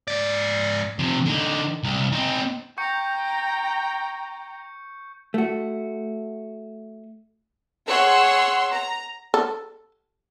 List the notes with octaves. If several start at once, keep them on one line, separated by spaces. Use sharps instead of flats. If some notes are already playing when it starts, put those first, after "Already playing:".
G#2 D5
C3 F3
D3 D#4
C2
C4 D#4
G5 A#5 C#6 G6 C#7
A3 F#4
G#4 C#5 F#5 C6 C#6 E6
A#5
A4